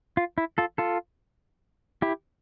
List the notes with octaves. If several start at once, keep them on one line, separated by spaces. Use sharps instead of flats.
F4
E4
F4 A4
F4 A4
E4 G4